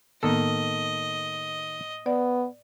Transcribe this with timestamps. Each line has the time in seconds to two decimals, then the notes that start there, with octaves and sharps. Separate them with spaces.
0.23 A2 D#3 A#3 B3 A4 D#5
2.06 B3 D5